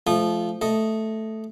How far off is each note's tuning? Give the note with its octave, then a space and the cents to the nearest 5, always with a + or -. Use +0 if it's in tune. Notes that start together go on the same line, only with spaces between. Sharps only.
F3 -10 A3 -30 D#6 -25
A3 +0 D#5 +0